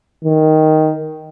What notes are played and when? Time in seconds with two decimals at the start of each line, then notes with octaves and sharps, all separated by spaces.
0.25 D#3